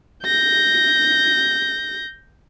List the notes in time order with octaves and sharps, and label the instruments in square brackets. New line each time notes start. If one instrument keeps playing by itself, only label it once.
[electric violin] G6 A#6